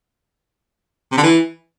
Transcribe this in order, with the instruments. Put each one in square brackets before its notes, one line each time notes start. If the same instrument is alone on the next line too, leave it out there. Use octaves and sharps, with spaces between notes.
[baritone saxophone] C3
D3
E3